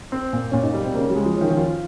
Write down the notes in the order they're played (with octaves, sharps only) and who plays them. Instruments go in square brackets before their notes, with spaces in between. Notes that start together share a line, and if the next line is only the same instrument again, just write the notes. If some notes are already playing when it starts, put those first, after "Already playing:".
[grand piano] C4
A#2
[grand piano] A#2 [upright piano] C#4
[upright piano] D#4
[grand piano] G3
[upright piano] C4
[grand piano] C#3 [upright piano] A#3
[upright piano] G3
[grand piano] G#3
[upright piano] F3
[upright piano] D#3 [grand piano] C#4
[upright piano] D#3
[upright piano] F3 [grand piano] F4